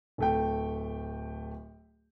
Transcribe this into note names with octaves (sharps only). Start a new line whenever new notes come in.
D1 A3 G5